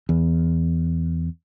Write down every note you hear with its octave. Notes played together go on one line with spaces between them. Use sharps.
E2